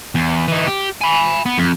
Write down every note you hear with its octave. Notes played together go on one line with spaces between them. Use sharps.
E2
E3 D#4
G4
G#5 B5
B3
F2